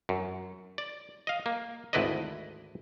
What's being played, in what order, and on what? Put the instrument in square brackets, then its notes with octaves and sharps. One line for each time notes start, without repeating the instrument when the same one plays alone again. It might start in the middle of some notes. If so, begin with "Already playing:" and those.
[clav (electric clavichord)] F#2
D5
D#5 F5
A#3
G#1 D2 E4 B4 D5 D#5